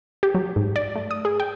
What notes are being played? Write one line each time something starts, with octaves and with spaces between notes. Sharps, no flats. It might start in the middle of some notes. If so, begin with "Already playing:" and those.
G4
F#3
G#2
D5
A3
D#6
G#4
G5